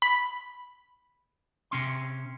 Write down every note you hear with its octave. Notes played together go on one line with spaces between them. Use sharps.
B5
C3 C#4 C6